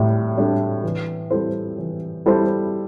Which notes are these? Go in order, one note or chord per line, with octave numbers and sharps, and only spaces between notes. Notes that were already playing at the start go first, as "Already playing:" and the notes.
Already playing: A2 G3
G3 D4 A4
E3
G3 E4 A4 C5
E3
G3 E4 A4 C5